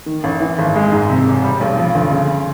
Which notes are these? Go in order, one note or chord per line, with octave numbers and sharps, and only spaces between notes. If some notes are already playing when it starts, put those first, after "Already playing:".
D#3
A1
E3
G#1
G#3
G#2
C3
E1
G3
B1
F3
D2
C#3